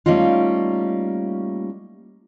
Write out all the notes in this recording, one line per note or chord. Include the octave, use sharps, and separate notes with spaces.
G3 A3 A#3 C#4 D#4 F4